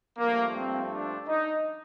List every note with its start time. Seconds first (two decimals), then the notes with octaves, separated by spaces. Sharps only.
0.19 G2 F3 A3 A#3
0.54 C4
0.92 D4
1.28 D#4